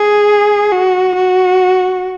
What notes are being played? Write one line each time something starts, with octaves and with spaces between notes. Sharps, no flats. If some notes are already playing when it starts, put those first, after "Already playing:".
Already playing: G#4
F#4
F#4